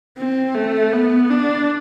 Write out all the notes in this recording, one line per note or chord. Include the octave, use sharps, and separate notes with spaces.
C4
A3
B3
D4